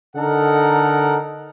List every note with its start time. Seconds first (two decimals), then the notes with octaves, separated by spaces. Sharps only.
0.16 D3 D#4 A4 A#4 F#5